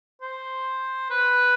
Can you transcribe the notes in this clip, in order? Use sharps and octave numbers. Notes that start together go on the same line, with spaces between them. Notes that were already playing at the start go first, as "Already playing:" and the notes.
C5
B4